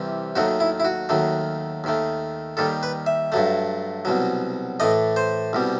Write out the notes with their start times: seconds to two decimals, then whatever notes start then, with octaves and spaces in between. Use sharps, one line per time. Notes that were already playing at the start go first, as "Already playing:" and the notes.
Already playing: C2 C3 E3 G3
0.35 D#2 D#3 F#3 A3 F#4
0.60 E4
0.80 E4
0.85 F#4
1.09 D#2 D#3 F#3 A3
1.84 D#2 D#3 A3
2.57 D#2 D#3 G3 A4
2.83 B4
3.06 E5
3.32 G2 F#3 A3
4.05 C2 B2 F#3
4.80 A2 E3 A3 D#5
5.16 C5
5.53 C2 B2 G3